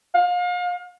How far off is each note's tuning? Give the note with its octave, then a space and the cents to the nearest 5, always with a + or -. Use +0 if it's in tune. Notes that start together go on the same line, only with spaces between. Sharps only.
F5 +35